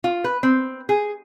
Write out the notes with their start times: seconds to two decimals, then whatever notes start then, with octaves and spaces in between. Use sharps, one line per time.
0.04 F4
0.24 B4
0.43 C4
0.89 G#4